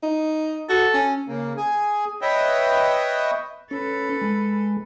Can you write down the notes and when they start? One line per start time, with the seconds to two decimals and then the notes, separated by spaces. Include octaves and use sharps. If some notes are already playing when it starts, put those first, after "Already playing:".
0.03 D#4
0.69 F#4 A4
0.94 C#4
1.27 C#3 A#3
1.57 G#4 G#5
2.22 B4 C#5 D#5 E5 G5
3.71 C#4 A4 B4
4.22 G#3